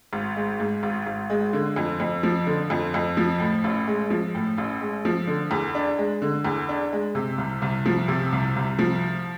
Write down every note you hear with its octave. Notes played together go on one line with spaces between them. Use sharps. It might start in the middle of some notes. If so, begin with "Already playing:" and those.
G#1
G#3
G#2
G#1
G#1
G#3
D3
F2
F2
F3
D3
F2
F2
F3
A2
A1
G#3
F3
A2
A1
G#3
F3
D3
E2
D4
G#3
D3
E2
D4
G#3
C3
C2
C2
F3
C3
C2
C2
F3